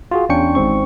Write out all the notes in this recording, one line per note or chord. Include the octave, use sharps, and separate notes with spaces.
F4 F#4 G#4
E2 C#4 D4 G5 C#6 C#7
G#1 G#2 C4 C#6